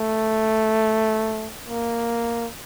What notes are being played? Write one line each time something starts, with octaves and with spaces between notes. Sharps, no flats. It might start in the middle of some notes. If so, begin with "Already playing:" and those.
Already playing: A3
A#3